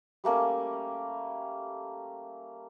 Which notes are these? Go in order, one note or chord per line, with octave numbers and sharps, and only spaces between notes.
G3 A3 A#3 C#4